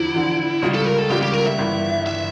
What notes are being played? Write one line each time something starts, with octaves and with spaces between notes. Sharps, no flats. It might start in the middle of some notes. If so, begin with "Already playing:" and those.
Already playing: E2 D3 F3 E4
E2 D3 F3
C#2 C#3 G3 C#4 F4
A4
A#4
A4
C#2 C#3 G3 C#4 F4 G4
G4
A#4
E5
G1 G2 E3
E3 E5